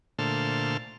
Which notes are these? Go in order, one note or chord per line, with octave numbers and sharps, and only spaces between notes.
A#2 D3 A3 C5 A5 F6